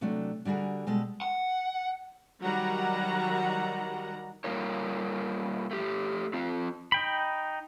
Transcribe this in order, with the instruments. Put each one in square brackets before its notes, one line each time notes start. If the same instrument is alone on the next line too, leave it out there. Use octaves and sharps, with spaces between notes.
[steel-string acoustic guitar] C3 F#3 A3 D4
D3 G3 F#4 G#4 A#4
B2 G3 G#3 A4
[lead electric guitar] F#5
[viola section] D#3 F#3 G3 F#5 A#5
[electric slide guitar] G3 A#3 F4 A#4 C#5
A3 G4
C4 F4
[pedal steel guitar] D#4 G5 B5